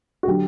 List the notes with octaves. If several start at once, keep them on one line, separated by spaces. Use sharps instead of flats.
F#4
D3 F#3 G4